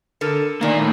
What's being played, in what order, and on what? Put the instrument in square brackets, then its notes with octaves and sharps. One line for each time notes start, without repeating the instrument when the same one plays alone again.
[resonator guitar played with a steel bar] D3 A4 A#4
[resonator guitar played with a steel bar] A#2 D#3 [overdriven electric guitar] A#3 D5
[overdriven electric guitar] A2